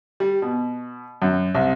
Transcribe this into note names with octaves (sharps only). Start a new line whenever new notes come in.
G3
B2
F#2
C2